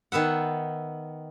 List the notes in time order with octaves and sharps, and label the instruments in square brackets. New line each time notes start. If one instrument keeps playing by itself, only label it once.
[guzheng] D#3 B3 E5 F#5